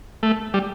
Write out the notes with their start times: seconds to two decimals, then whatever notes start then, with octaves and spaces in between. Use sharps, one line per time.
0.23 A3
0.54 G3